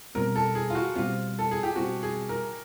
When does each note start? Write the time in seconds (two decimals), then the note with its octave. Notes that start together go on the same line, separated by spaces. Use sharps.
0.15 B2 G3 C4 A#4
0.36 A4
0.55 G#4
0.70 F4
0.75 F#4
0.96 B2 G3 C4 F4
1.39 A4
1.51 G#4
1.63 G4
1.76 B2 G3 C4 F#4
2.03 G#4
2.29 A#4